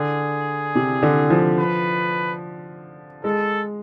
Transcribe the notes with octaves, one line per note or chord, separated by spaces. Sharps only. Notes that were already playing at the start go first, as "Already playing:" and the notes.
Already playing: D3 G#4
C3
D3
F3
B4
G#3 A4